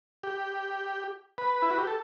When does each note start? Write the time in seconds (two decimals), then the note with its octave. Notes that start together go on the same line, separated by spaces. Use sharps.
0.23 G4
1.38 B4
1.62 E4
1.71 F#4
1.78 G4
1.87 A4